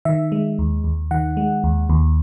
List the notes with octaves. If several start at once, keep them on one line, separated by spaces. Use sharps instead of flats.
D#3 E5
G#3
D#2
D#2
D#3 F#5
G#3
D#2
D#2